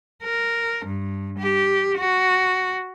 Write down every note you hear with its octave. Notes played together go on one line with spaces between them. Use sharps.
A#4
G2
G4
F#4